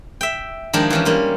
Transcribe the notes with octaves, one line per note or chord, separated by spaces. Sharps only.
E5 G5
D#3 F3 G#3 D4 G4 A#4
E3 F3 C#4
G3 A#3 F4